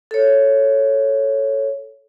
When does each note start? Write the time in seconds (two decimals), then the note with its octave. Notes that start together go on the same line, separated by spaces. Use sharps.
0.11 A4 C#5